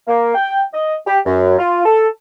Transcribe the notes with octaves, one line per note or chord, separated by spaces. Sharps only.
A#3
G5
D#5
G4
F#2
F4
A4